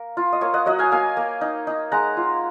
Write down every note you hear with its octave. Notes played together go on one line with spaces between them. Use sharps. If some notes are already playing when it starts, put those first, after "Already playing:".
Already playing: A#3 A#4
F4
D#5
A#3 C#5 F5
D#5 F#5
F#3 D#5 F#5
F5 G#5
A#3 F5 G#5
A#3
D#4
D#4
G#3 F#5 A#5
F4